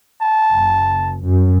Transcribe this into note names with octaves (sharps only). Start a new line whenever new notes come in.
A5
F#1
F#2